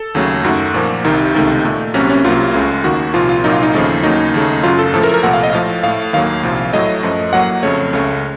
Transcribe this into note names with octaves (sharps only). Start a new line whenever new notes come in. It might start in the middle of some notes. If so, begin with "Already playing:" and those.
Already playing: A4
D#2 C#3 F#3 A3
F#2 D#3 A3 F#4
A#2 F3 A#3
C2 C3 D#3 D#4
C#2 C3 D#3 A3
A#2 A3
C2 C3 F#3 A#3 C#4
C#4
C2 C3 F#3 A#3 F4
C#2 C#3 A3
D#2 D#3 A#3 F#4
C2 A#2 F3 F4
F4
C2 A#2 F#3 A#3 D#4
F4
D#4
D#2 C#3 F3 A3
D#2 C#3 F#3 A#3 D#4
D#2 C#3 A3
F#2 C#3 F#3 F4
A4
A2 F3 A3 A4
A#4
A#4
C2 A#2 F3 A3 F#5
F5
D#5
A2 F3 A3 F5
A2 A3 F5
D#2 D#3 F#3 A#3 F5
C2 A#2 F3
A2 F#3 A3 D#5
F#2 F3 A3
A2 F#3 A#3 F#5
F2 C#3 A3 C#5
C#2 C#3 A3